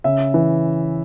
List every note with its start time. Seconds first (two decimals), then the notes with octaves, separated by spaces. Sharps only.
0.04 C#3 E5
0.34 E3